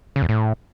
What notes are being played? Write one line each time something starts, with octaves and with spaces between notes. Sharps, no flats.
C#3
E2
A2